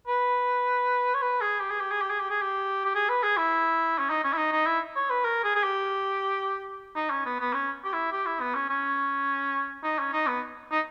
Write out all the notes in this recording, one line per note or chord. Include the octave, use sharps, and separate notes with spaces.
B4
C#5
B4
G#4
G4
G#4
G4
G#4
G4
G#4
G4
G#4
G4
G4
G#4
B4
G#4
E4
C#4
D#4
C#4
E4
D#4
D#4
E4
C#5
B4
A#4
G#4
G#4
G4
D#4
C#4
B3
B3
C#4
G4
E4
G4
E4
B3
C#4
C#4
D#4
C#4
D#4
B3
D#4